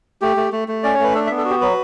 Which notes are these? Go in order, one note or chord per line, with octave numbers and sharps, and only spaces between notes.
A3 G4
A3
A3
A3
C#4 D5
C#5
A3 B4
D4 A4
E5
B3
A4
F#4
G4
F#3 B4